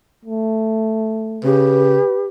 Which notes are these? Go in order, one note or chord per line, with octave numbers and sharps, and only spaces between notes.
A3
C#3 G4 B4